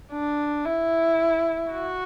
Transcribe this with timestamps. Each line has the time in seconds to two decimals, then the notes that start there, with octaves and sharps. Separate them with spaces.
0.12 D4
0.65 E4
1.72 F#4